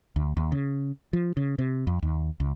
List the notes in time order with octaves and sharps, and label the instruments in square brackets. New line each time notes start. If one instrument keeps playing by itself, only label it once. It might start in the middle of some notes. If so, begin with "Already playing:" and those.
[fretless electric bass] D2
D#2
C#3
F3
C#3
C3
F2
D#2
C#2